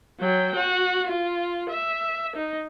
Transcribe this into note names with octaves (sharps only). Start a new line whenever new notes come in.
F#3 G5
F#4
F4
E5
D#4